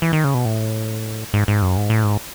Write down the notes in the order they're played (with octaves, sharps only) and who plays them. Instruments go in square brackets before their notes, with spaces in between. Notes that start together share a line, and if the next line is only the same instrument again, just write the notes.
[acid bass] E3
D#3
C#3
B2
A2
G#2
G#2
F#2
G#2
A2
G#2